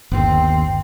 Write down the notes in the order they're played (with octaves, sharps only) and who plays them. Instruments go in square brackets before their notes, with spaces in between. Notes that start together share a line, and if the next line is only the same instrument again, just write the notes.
[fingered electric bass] G1 D#2 [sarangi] C4